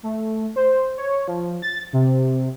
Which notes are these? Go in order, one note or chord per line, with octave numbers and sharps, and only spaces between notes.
A3
C5
C#5
F3
A6
C3